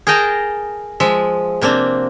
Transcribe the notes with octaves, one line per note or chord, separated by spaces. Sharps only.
G#4 A#4 D#5 G5 A5 A#5
F3 G#3 E5
C3 A#3 C4 D4